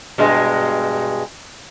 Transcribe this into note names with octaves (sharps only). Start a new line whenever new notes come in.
G2 B2 G#3